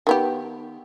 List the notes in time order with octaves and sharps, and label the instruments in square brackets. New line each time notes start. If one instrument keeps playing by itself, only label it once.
[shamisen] D#3 B3 G4